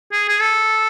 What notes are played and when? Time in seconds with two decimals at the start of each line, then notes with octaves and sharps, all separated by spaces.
0.13 G#4
0.29 G#4
0.41 A4